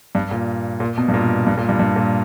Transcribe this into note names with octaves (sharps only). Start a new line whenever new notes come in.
G2
A#2
A#2
B2
G2
A#2
G2
A#2
G2
G2
A#2